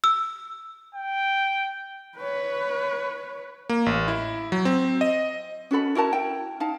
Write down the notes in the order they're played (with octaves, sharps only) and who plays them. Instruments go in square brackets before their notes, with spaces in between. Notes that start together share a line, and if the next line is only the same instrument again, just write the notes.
[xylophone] E6
[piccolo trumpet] G5
[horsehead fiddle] B4 C#5
[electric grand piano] A#3
A1
E4
F#3
C4
D#5
[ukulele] C#4 F#4 A4 B5
E4 F#4 A#4 A5
E4 G5
D#4 F5 A5